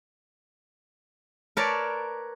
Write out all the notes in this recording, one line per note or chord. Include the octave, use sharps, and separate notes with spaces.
A#4 B4 C#5 D5 A5